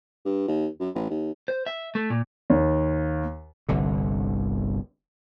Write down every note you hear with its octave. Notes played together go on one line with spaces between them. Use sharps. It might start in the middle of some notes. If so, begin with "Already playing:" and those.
G2
D#2
F#2
A1
D#2
C5
E5
A3
A#2
D#2
G1 C2 D3